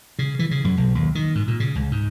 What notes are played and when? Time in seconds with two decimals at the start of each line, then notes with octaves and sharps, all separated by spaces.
0.19 C#3
0.39 E3
0.51 C#3
0.64 F#2
0.77 B1
0.95 D#2
1.15 D#3
1.35 G#2
1.48 A#2
1.60 C#3
1.75 C#2
1.91 G#2